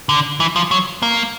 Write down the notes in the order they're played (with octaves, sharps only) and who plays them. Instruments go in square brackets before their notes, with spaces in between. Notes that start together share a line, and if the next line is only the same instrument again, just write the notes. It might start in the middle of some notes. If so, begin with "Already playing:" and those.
[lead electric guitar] D3
E3
F3
F#3
A#3